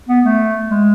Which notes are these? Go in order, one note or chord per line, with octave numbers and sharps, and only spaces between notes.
B3
A3
G#3